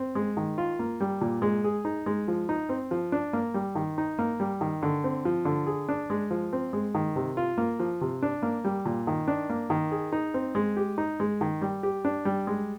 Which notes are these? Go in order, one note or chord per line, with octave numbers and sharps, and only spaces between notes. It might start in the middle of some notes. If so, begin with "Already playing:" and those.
Already playing: C4
G#3
D#3
F4
A#3
G3
A#2
G#3
G#4
D#4
G#3
F3
D#4
C4
F3
D4
A#3
G3
D#3
D#4
A#3
G3
D#3
D3
C4
F3
D3
G#4
D4
G#3
F3
C4
G#3
D#3
C3
F4
A#3
F3
C3
D4
A#3
G3
A#2
D#3
D4
A#3
D#3
G#4
D#4
C4
G#3
G4
D#4
G#3
D#3
G3
G4
D4
G3
G#3